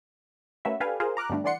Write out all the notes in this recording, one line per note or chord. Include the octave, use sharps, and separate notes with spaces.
A3 A#3 C#4 F#4 B4 E5
D4 G4 A4 B4 F5 G#5
F4 G#4 A#4 C5 F5
A#5 D6 F6 F#6
G2 B2 D3 G3 A3 D4
D3 E3 D5 F#5 C6 C#7